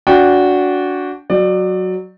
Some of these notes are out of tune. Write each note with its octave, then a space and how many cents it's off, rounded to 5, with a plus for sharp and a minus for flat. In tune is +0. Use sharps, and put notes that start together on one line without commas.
D4 -25 F#4 -10 G5 +0
F#3 +0 D5 +25